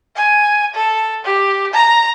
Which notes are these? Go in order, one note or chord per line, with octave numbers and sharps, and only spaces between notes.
G#5
A4
G4
A#5